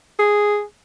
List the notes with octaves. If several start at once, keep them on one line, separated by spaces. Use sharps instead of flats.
G#4